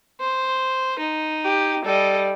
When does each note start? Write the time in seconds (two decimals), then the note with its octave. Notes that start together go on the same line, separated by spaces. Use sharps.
0.20 C5
0.99 D#4
1.44 G4
1.85 G3 A4 D#5